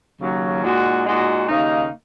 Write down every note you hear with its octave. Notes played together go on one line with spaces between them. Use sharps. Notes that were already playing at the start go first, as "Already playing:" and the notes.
D#2 C#3 F#3
A#2 G#3 D#4 F#4
A#2 G#3 D#4 F#4
D#2 C#3 A#3 D#4